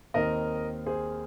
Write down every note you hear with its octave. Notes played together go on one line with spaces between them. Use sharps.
D#2 D#3 C4 A#4 D#5
G#4 C5